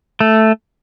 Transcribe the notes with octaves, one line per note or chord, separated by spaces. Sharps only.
A3